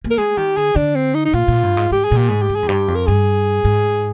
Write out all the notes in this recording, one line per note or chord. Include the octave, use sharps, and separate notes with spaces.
A#3
A#4
G#3 G#4
D#3 G4
D3 G#4
D3 D4
C4
D#4
D#4
A#2 F4
A#2
G2
G#2
G#2 G4
G#4
A#2
G4
G#2 G#4
G4
G#2
G#4
F2
G2 G4
F2
A#4
G2 G#4
G#2